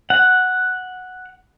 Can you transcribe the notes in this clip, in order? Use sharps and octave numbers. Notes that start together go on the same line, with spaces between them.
F#5